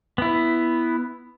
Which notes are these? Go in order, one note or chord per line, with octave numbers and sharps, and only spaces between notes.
B3 E4